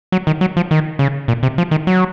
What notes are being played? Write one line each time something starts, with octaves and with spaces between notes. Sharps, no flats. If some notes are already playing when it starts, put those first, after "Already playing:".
F#3
D#3
F#3
F3
D#3
C#3
A#2
C3
F3
D#3
F#3